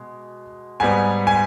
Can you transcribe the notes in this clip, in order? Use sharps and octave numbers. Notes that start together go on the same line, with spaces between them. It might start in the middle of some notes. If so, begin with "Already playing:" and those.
Already playing: B2 G#3
G#2 G3 B3 G#5
G#5